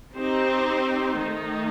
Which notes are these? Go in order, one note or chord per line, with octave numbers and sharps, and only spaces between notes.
C4 D#4 G4 C5
D#3 A3 D#4